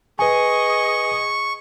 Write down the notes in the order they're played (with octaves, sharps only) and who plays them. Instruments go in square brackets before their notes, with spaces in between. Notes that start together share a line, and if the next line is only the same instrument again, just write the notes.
[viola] G#4 D#5 [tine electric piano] B4 G#5 [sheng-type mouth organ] C#6